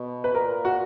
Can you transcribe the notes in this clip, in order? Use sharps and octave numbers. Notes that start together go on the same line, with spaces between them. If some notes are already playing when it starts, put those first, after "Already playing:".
Already playing: B2
B4
A#2 A#4
F#4